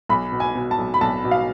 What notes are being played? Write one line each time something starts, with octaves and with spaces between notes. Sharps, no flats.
B1 B5
B2
G#5
B2
A5
B1
B5
B1 A5
B2
F5